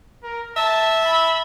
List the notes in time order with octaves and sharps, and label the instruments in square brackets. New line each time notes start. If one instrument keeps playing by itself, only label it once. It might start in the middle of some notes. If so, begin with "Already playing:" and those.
[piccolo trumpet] A#4
[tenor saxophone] E5 [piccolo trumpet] A5
[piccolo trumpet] B5